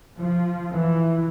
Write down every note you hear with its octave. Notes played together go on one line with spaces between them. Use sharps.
F3
E3